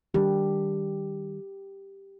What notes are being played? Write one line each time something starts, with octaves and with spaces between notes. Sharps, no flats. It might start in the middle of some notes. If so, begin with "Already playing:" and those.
D#3 G3 D4 G4